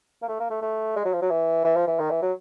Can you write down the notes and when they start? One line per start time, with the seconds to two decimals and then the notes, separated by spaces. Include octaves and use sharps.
0.22 A#3
0.28 A3
0.40 A#3
0.50 A3
0.62 A3
0.96 G#3
1.05 F#3
1.13 F3
1.22 F#3
1.30 E3
1.64 E3
1.76 F3
1.87 E3
1.99 D#3
2.10 E3
2.22 F#3